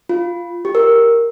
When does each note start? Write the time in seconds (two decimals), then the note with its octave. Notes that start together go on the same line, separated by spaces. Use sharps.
0.09 F4
0.65 G4
0.75 A#4